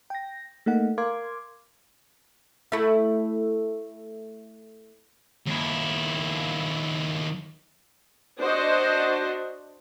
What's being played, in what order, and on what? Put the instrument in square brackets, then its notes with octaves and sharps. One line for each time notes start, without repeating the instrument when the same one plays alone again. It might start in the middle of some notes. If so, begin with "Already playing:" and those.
[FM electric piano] G5 A#6
A3 A#3 D#4 F#5
A#4 F5 C6 D6 G#6
[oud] A3 E4
[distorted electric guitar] D#2 E4
[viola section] D4 F#4 C5 D#5